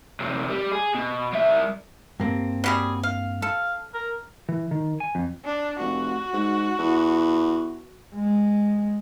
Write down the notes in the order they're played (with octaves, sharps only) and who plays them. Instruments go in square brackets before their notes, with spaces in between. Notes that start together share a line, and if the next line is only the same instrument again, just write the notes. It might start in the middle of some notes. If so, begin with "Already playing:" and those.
[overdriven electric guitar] F#2 C3
G3
G#4
B2
G3 E5
[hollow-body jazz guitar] G2 A#3 C4
[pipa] F#3 G3 G#4
F5
[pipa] A4 [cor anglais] F5
[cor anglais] A#4
[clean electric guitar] E3
D#3
G#5
F2
[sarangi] D4
[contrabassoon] F1 [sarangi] F#4
[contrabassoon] G#2
E2
[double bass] G#3